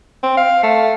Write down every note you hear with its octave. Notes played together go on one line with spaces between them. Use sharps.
C4
F5
A3